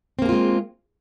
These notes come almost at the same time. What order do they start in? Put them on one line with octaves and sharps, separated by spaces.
C4 A#3 G#4 F4 G#3